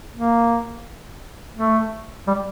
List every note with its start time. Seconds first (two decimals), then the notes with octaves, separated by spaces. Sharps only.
0.15 A#3
1.57 A3
2.27 G3